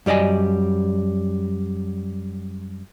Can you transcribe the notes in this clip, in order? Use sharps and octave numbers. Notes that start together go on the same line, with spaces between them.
F#2 G3 D5 D#5 G#5